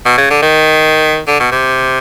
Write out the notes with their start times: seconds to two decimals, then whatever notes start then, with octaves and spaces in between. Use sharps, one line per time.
0.06 B2
0.18 C#3
0.30 D3
0.42 D#3
1.27 D3
1.40 B2
1.52 C3